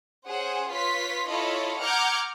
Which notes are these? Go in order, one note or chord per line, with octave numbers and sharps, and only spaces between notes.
C#4 G#4 C5 F#5
F4 B4 C#5 C6 B6
E4 F4 A4 C#5 D#5 B5
F#5 A#5 D6 F6 G6 G#6